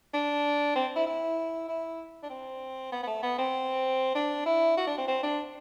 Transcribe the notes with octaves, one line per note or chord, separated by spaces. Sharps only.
D4
C4
E4
E4
E4
D4
C4
B3
B3
A3
B3
C4
D4
E4
F#4
D4
C4
C4
D4